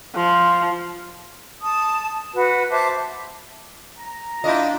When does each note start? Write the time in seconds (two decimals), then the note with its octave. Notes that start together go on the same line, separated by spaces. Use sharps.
0.15 F3
1.61 A5 D#6
2.34 F#4 B4
2.70 C5 E5 A5 D6
3.99 A#5
4.44 D4 E4 F4 D#5 G5